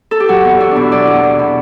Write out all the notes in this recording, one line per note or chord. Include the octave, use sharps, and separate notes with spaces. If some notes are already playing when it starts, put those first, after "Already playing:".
A4
G4
F#3 F#4
E2
E2 F#4
D4
B2
E4
F#3 D5
E2
E2
B2